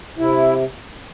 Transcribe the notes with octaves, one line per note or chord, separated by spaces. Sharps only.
C3 E4